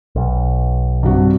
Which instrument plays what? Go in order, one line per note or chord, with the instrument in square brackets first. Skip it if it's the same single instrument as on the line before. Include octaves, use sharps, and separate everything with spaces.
[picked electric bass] B1
[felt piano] G2 C3 F#4